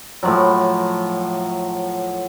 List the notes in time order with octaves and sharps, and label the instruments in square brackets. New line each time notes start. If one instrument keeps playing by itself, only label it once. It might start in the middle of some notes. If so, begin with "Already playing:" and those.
[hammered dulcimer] A2 F3 F#3